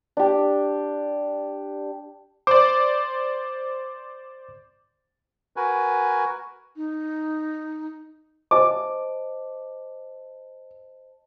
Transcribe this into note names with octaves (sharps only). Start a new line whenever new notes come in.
D4 G4
C5 D5 D6
F#4 A#4 B4 G#5
D#4
C5 D#5 A5 D6